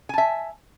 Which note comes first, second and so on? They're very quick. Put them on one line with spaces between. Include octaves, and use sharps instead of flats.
G#5 A5 E5